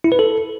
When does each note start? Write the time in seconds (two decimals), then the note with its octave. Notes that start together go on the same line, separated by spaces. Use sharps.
0.04 E4
0.12 B4
0.19 A4